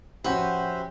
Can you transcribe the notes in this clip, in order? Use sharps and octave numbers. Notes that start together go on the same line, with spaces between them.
F3 C#4 F#4 G4 B4 C5 E5